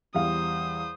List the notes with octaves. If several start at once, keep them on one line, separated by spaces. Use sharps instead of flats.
E2 G3 C5 F5 D#6